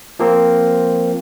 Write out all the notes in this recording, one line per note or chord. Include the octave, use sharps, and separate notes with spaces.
F3 A#3 C4